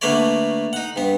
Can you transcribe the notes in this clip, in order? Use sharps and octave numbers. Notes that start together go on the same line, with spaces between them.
D3 A3 A#3 B4 C#5 D5
D#4 F#5
G2 B3